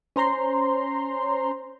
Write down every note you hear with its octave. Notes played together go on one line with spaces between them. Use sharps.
C#4 C5 A#5 C6